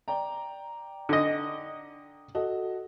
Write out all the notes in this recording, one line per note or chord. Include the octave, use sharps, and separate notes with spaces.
D5 G5 A#5
D3 D#5
F#4 A4 D#5